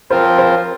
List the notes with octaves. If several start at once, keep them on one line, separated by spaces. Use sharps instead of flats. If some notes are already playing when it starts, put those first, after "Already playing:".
F3 C4 F4 A#4 C5
C5